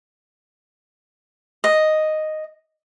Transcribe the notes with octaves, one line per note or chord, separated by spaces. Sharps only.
D#5